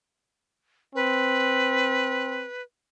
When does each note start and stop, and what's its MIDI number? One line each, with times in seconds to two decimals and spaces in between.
0.95 2.46 60
0.95 2.62 71